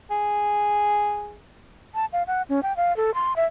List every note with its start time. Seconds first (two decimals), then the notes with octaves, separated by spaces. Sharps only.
0.11 G#4
1.95 A5
2.13 F5
2.27 F#5
2.49 C#4
2.63 G5
2.77 F5
2.97 A4
3.14 C6
3.36 E5